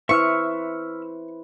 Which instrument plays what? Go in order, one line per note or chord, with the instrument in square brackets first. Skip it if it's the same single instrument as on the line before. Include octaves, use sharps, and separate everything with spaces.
[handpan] E4 B4 C5 [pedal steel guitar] E5 E6 F6 [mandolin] C#6